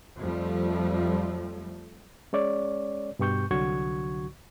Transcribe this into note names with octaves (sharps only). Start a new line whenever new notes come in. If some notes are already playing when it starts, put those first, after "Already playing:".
F2 F3 G3 A3
G#3 C#4 C#5 D5
G2 B2 G4 C#6 G6
C2 D3 F#3 F#4 C#6 G#6